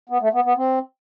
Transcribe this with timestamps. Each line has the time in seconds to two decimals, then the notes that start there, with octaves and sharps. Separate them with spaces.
0.09 B3
0.21 A3
0.33 B3
0.45 B3
0.57 C4